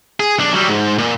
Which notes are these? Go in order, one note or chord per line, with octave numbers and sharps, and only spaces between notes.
G#4
B1 D4
F#3 G3
G#2
A#2